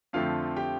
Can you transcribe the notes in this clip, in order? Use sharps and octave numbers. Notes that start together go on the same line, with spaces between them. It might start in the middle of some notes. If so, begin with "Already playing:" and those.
F2 D3 F3 A3 C4 F4 F5
G4 G5